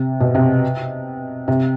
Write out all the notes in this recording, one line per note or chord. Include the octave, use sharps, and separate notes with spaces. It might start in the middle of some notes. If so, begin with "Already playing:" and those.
Already playing: C3
B2
C3
C3